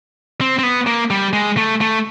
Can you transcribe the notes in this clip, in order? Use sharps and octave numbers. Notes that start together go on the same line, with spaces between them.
C4
C4
B3
A#3
G3
G#3
A3
A3